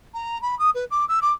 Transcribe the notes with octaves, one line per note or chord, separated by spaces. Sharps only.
A#5
B5
D#6
B4
D6
E6
D6